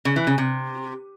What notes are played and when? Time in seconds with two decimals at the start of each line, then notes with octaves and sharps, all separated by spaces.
0.05 C#3
0.16 E3
0.27 C#3
0.38 C3